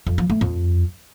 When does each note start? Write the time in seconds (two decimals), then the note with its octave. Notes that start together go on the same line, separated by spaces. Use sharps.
0.07 F2
0.18 F3
0.30 A3
0.41 F2